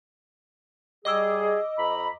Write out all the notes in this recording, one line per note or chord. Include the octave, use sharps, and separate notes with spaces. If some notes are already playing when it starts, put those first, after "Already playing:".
G3 G#4 D#5 D6 E6
F2 A#5 B5